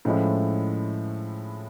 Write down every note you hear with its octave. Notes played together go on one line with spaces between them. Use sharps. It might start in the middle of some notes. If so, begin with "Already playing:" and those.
A2 F3 G#3 C#4 E4